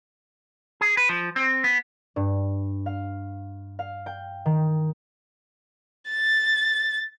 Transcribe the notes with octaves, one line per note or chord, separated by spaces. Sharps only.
G#4
B4
F3
C4
B3
G2
F5
F5
G5
D#3
A6